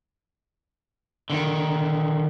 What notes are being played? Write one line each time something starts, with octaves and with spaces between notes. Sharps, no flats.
D3 D#3